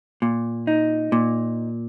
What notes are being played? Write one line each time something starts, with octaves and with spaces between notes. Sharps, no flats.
A#2
D#4
A#2